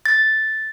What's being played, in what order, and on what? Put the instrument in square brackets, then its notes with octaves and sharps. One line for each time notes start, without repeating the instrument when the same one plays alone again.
[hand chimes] A6